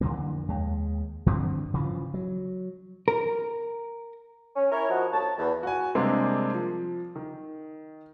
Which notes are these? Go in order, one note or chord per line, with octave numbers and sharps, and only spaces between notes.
F2 D3 E3 A#3
D#2 G#3
G2 D3 C4
C#3 E3 F3
F#3
A#4
C#4
E4 A#4 C#5
F3 D#4 F#4
C2 F#4 C#5 A5
E2
F#4 G#5
C3 G3 G#3 A#3 C4 D4
F3
D#3